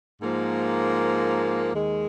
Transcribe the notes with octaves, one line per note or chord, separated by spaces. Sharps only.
G#2 F3 A#3
D#2 D#3 G#3